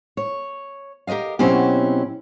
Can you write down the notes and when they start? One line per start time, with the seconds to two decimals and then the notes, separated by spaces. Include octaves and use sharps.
0.17 C#5
1.07 G4 A#4 B4 D#5 F5
1.39 B2 F#3 C4 C#4 E4 G4